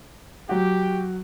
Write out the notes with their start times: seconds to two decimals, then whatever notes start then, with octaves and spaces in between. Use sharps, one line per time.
0.49 F#3 F#4 G4